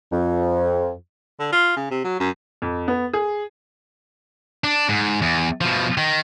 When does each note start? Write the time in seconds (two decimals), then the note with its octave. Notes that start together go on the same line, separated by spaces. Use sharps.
0.12 F2
1.40 D3
1.52 F4
1.77 C#3
1.91 C3
2.05 F#3
2.20 F#2
2.62 F2
2.88 B3
3.13 G#4
4.64 D4
4.89 G#2
5.22 E2
5.61 B2 F3
5.98 D#3